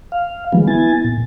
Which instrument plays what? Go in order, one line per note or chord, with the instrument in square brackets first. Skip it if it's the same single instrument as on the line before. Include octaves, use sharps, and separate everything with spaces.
[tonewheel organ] F5
D#3 F3 F#3 G#3 B3
B3 E4 G#5 A6
A#2